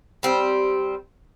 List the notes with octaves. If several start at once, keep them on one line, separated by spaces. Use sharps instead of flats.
G3 C4